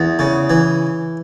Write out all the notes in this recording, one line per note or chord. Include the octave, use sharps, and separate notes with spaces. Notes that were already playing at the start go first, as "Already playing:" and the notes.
Already playing: E2
C#3
E3